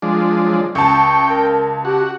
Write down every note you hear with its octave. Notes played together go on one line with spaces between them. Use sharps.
F3 G#3 D4
F#3
C#2 G5 A5 C#6
A#4
F#4 G4